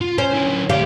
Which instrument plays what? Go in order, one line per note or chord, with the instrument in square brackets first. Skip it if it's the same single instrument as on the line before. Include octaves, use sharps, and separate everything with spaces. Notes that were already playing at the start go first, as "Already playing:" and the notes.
[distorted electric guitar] F4
[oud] C#4 [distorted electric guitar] C5
[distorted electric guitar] D3 E4
[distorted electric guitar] D2 D5 [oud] G4 F5